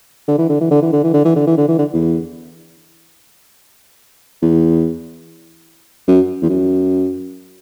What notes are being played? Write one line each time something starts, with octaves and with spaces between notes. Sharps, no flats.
D3
E3
D3
E3
D3
E3
D3
E3
D3
E3
D3
E3
D3
E3
D3
E2
E2
F#2
E2
F#2